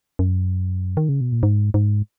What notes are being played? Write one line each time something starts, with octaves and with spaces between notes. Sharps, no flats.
F#2
D#3
C#3
B2
A#2
G#2
G#2